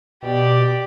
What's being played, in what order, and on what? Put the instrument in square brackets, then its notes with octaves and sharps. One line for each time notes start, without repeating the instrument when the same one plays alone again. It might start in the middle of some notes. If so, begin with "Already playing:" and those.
[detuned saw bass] B2 [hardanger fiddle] G4 D5